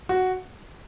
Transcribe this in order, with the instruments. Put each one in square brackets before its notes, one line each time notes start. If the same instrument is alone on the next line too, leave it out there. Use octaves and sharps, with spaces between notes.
[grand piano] F#4